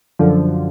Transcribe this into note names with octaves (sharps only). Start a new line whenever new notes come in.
F#2 D3 F3